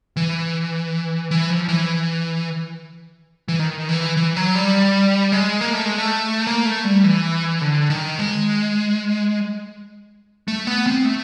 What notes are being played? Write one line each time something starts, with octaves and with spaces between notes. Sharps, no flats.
E3
E3
F3
E3
E3
D#3
E3
E3
F#3
G3
G#3
A#3
A3
G#3
A3
A#3
A3
G3
E3
D3
D#3
G#3
A3
B3
C4
A3